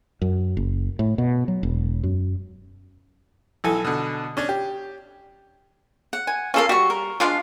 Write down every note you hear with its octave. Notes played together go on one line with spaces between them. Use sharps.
F#2
F#1
A2
B2
F#3
E1
F#2
B1 E3 A4 G#5
B2 D3
C#4 D4 C#5
G4
F#5
G#5
A#3 C#4 F4 A4 F5
G3 F#4 C#6
A#4
F3 G#3 D4 F4 F5